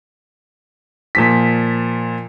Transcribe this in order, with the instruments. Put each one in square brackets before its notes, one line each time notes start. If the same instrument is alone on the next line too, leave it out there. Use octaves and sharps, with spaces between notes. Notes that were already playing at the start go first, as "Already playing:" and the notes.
[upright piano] A#2 F3 B6